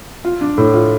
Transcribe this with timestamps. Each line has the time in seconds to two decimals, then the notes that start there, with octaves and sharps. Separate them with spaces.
0.25 F4
0.41 D4
0.58 A2
0.74 F4